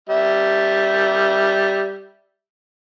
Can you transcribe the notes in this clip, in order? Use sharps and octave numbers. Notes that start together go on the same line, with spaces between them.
G3 E5